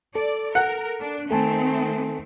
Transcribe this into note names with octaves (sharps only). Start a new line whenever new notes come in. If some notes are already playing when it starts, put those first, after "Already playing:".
A4 D5
A#4 F#5
D4
D#3 A3 C4 A4 G#5 A5